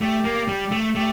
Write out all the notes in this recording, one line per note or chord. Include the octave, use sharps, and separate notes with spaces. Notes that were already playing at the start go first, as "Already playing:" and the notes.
A3 G4 D5 G5
A#3
G3
A3
A3 G4 D5 G5